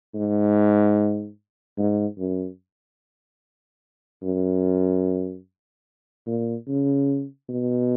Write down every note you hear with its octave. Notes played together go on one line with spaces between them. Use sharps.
G#2
G#2
F#2
F#2
A#2
C#3
B2